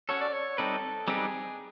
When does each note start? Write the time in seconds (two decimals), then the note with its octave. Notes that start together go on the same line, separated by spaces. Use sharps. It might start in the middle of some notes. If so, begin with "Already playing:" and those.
0.08 C#4 F#4 A4 C#5
0.21 D5
0.33 C#5
0.58 G3 C4 D#4 G4 A4 B4
1.07 G3 C4 D#4 G4 G#4 B4